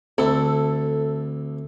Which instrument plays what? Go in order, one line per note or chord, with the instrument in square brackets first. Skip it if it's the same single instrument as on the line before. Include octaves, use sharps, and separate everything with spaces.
[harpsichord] D2 E4 [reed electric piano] C4 [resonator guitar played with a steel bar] A4